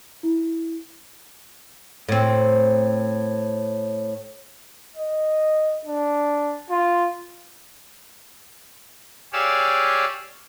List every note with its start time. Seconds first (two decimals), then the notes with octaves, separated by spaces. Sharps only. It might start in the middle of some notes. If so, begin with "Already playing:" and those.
0.23 E4
2.09 A2 C4
4.97 D#5
5.86 D4
6.70 F4
9.33 G4 G#4 C#5 D5 F5 E6